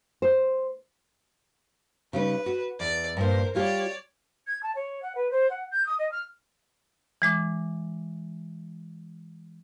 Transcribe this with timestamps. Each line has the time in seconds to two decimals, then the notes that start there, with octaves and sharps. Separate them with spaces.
0.22 C5
2.13 C#3 G3 D#4 B4
2.46 F#4
2.80 E2 D5
3.17 G2 A#2 A#4 C5
3.55 G3 F4 G4 C#5 D5
4.47 G#6
4.63 A5
4.75 C#5
5.02 F#5
5.15 B4
5.31 C5
5.50 F#5
5.71 G6
5.87 D#6
5.99 D#5
6.12 F6
7.22 E3 G#3 D6